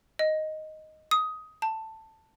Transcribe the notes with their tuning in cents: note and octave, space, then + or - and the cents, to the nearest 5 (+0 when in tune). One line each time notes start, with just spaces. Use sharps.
D#5 +0
D#6 +15
A5 +10